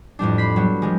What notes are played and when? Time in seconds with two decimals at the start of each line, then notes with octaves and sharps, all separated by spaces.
0.19 F2 A2 G3 D4
0.38 B5 C6 B6
0.56 F#3 G3 B3
0.82 F3 G3 G#3